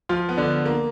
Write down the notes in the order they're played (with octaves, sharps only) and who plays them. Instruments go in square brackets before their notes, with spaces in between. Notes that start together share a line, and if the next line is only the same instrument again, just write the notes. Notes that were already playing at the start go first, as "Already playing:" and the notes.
[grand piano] F3 F4
B3
D3 D4
A#3